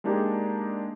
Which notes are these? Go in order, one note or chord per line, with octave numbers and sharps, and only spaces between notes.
G#3 A#3 D4 D#4 G4 G#4